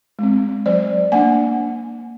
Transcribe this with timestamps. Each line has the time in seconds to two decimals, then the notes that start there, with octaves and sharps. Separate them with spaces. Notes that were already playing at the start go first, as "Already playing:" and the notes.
0.19 G#3 C4
0.66 F#3 C5 D5
1.12 A#3 D4 F#5 G#5